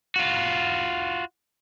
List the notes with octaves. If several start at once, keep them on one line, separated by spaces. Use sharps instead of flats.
F4 F#4